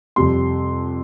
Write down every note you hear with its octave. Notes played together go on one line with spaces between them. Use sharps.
F2 C3 G3 C6